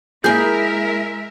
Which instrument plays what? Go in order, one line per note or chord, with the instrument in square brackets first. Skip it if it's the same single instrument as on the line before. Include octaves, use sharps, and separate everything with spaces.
[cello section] G#3 A#4 E5 [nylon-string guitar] A#3 E4 [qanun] G#4 G#5 [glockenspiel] G6